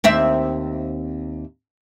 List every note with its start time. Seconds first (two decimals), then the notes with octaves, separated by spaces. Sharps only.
0.04 D#2 C4 E5